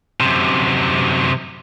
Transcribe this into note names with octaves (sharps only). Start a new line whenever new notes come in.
F#2 C3